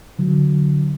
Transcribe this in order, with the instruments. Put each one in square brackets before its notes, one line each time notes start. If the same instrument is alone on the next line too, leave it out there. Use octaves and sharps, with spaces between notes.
[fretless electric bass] D3 F#3